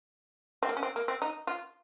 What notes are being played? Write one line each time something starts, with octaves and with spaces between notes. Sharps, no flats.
C4
A#3
C#4
C4
A#3
C4
D#4
F4